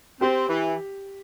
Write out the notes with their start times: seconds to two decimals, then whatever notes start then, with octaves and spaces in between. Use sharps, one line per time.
0.21 C4 G4
0.49 E3